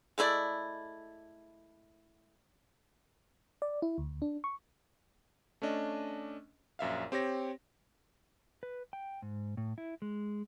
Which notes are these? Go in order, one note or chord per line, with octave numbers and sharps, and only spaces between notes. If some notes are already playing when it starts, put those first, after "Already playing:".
G#3 A3 E4 D5
D5
E4
D2
D4
C#6
A3 C#4 D4 D#5
A#1 F#2 E5 F5
C4 G4 C#5 A#6
B4
G5
G#2
A2
E4
G#3